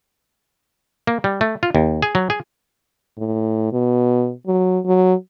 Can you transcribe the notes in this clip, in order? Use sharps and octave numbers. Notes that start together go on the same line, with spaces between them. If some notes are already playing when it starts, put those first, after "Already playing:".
A#3
G3
A3
F4
D#2
G#4
F#3
G#4
A2
B2
F#3
F#3